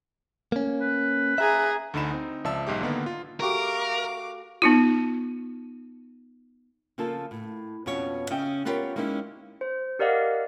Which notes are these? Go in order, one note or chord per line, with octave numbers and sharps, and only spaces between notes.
A#3 C#4
B4
G#4 E5 A#5
D2 D3 D#4 B5 E7
C4 D#4
C#2 F3 D5 E5 A5 E6
B1 G#2 G4 D6
D3 D#3 A#3 B3
F4
A3 F#4 G4 A#4 F5 D6
B3 D#4 F4
C#3 F3 A#3 F4 A4
A2
F2 B2 B3 C#4 C#5
C#3 C#4 D#5 E5 G5
B3 C#4 F4 G4 A#4 C#5
G#3 A#3 C#4 D#4 E4 G4
C5
G4 A#4 D5 D#5 F5 F#5